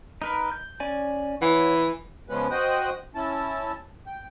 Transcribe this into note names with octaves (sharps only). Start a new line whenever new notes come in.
D#4 A#4 B4
G6
C#4 D5 G#5
E3 C#5 F#5
C#3 F3 G#3 B3 C#4 B4
F#4 C5 D#5 G5 D#6 F#6
C#4 E4 A5
G5